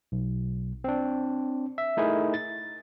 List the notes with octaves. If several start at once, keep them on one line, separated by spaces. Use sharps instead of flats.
B1
C4 D4
E5
A3 D#4 E4 G#4 A#4
A6